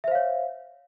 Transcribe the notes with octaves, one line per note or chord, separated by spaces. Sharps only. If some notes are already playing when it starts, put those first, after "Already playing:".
C5 C#5 E5 F5